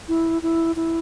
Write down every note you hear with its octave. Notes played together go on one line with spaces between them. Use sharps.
E4
E4
E4